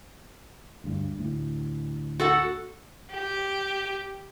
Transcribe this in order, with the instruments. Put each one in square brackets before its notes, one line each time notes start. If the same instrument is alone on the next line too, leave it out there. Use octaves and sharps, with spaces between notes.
[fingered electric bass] D2 G2
D2 A2
[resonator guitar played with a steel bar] F#4 A4 F#5
[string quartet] G4